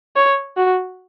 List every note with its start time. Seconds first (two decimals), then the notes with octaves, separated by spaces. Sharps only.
0.16 C#5
0.57 F#4